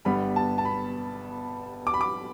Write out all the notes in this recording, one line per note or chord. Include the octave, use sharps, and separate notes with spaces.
G1 G2 G3 B3 B5
A5
A5
B5
D6
B5
D6